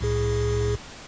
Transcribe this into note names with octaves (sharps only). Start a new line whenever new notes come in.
C2 A2 G#4